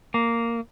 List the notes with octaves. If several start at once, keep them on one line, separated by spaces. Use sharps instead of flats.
A#3